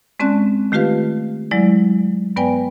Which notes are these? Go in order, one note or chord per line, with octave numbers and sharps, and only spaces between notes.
G#3 C4 C#4 D5 A5 F#6
D#3 A3 F4 G4 B4 F5
F#3 G#3 E4 D5
G2 B3 B4 D5 G5 G#5